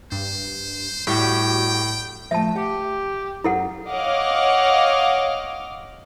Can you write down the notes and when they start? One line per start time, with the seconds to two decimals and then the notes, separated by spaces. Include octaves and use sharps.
0.12 G2 C5
1.07 A2 G3 F#4 G4 G5
2.31 F3 A3 E5 A5
2.56 G4 F#5
3.44 F#2 E4 A4 F#5
3.89 C#5 D#5 F5 F#5 D6 F6